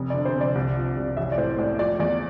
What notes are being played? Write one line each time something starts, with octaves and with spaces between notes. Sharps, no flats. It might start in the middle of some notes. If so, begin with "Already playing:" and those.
Already playing: F1
D5
D3
C5
F1
D5
C2
F3
C2
A1 E5
D5
A2 C5
A2 D5
F3 D5
E2 D5